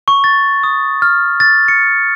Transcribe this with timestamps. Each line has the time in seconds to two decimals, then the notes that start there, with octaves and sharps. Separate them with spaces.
0.08 C#6
0.24 A6
0.63 D#6
1.02 F6
1.40 A6
1.68 C#7